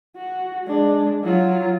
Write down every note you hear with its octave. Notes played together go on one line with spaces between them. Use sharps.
F#4
G#3 D4
F#3 F4